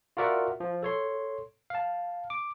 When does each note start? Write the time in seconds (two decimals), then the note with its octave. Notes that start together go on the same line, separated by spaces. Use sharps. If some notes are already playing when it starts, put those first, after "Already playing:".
0.17 F4 F#4 A#4 D5 E5 F#5
0.60 F3
0.83 A4 C#5 C6
1.70 F5 A5
2.30 D6